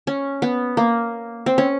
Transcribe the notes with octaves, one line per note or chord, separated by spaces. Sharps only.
C#4
B3
A#3
C4
C#4